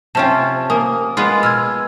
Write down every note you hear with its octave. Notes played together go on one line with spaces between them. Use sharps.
C3 C#4 F4 G5 A5
A#3 A#4 G#5 D#6
G#3 B3 F4
B2 E6 F6 G#6